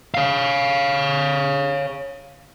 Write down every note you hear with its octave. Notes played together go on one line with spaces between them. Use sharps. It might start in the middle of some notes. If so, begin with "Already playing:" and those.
C#5 F5